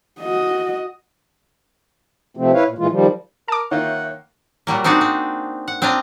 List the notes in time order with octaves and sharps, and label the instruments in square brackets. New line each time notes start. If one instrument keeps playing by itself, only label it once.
[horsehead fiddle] F#4 D#5
[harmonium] C3 F3 A3 C4
E4 B4 C#5 F5
A#2
A#2 E3 G#3 F4
D#3 F3 G3
[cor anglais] A#4 [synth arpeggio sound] A5 D6
[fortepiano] D#3 A#3 F4 [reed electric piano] C#5 E5 G6 [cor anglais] F#5
[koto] A#2 F#3 G3 A#3
C4 D4 D#4 F#4 G#4 D5
C4
F#5
C4 D4 F4 D#5 F5 A#5